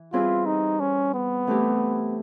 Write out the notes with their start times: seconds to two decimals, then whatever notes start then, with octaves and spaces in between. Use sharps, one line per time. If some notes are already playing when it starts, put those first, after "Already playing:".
Already playing: E3
0.13 G3 C4 E4 F4 G#4 B4
0.46 D#4
0.80 C#4
1.14 B3
1.47 E3 A3 C4 E4 G4